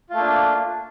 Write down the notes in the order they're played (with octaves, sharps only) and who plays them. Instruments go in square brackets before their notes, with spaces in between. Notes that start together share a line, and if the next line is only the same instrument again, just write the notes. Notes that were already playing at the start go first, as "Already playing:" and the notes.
[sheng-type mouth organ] F4
A3
A#3
D4